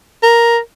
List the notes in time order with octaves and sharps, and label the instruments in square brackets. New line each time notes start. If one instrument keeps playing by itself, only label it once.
[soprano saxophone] A#4